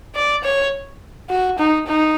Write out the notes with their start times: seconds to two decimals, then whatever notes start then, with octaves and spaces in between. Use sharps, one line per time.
0.15 D5
0.44 C#5
1.29 F#4
1.58 D#4
1.87 D#4